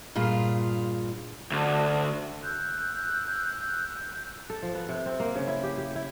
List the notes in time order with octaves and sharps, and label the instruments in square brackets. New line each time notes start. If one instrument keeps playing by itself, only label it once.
[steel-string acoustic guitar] G2 A#2 F4 G#4
[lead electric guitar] D2
[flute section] E6 F#6 G6
[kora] A4
F3
B3
C3
C4
A#3
C#3
E4
G4
G4
E4